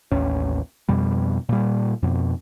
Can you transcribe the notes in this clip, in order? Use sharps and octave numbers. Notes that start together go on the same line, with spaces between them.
A1 D#2 C#4
F2 B2 G3
A#2 G3
F2 B2